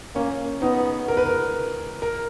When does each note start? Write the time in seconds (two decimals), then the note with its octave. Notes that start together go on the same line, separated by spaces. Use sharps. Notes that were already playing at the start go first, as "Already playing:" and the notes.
0.15 A#3 C#4
0.61 B3 D#4
1.08 A#4
1.17 B4
1.26 A#4
2.02 A#4